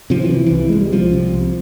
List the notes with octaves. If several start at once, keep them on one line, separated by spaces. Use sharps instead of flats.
C3 F3
E3
C3
C2 E3
C2 G#3
G3
C3 F3
C3
C2